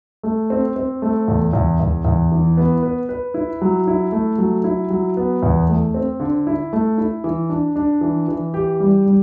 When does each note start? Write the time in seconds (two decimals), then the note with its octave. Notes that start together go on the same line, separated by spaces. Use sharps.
0.23 A3
0.50 C4
0.76 C4
1.02 A3
1.28 E2
1.53 E2
1.80 E2
2.05 E2
2.32 E3
2.57 B3
2.83 B4
3.09 B4
3.34 E4
3.61 F#3
3.87 E4
4.12 A3
4.38 F#3
4.64 E4
4.90 F#3
5.17 B3
5.43 E2
5.68 A3
5.94 C4
6.20 D3
6.47 E4
6.73 A3
6.98 E4
7.24 E3
7.49 D4
7.76 D4
8.01 E3
8.28 E3
8.54 G4
8.80 G3
9.06 G3